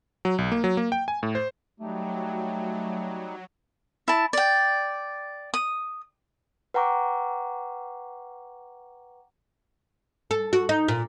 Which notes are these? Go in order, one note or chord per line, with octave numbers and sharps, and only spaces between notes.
F#3
B1
A#3
F#3
A#3
G5
G#5
A2
C5
F#3 G3 A3 D#4 G4
E4 A5
D5 G5
D#6
B4 F#5 G5 A#5 C#6 D6
A4
F#4
D#4
A#2